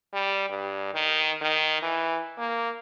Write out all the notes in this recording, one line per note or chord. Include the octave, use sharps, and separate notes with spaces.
G3
G2
D#3
D#3
E3
A#3